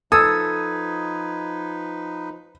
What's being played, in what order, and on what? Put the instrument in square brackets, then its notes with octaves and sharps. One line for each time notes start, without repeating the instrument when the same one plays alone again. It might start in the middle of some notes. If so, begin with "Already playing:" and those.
[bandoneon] F3 D#4 B4 [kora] A4 [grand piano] D#6 [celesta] G#6